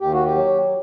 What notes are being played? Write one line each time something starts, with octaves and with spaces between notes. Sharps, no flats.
D#2 G4
F#4
G4
F#3